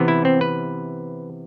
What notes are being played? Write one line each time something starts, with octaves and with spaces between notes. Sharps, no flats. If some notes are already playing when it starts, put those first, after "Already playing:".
Already playing: C3 E3 B3
E4
C4
B4